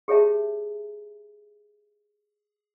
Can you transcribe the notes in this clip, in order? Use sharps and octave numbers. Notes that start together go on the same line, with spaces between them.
G4 G#4 C#5 E5 A5